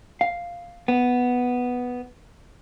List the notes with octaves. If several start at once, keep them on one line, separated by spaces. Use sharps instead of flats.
F5
B3